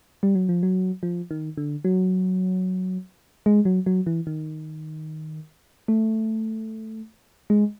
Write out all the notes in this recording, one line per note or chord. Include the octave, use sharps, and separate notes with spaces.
G3
F#3
F3
F#3
F3
D#3
D3
F#3
G#3
F#3
F#3
E3
D#3
A3
G#3